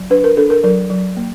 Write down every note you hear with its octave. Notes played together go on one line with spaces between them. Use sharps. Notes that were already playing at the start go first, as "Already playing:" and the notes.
Already playing: F#3
D4 B4
A#4
D4 A4
A#4
F#3 A#4
F#3
A#3